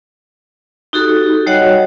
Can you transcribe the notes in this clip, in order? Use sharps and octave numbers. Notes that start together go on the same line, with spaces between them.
D#4 F#4 G4 A4
G3 F#4 C#5 D#5 F#5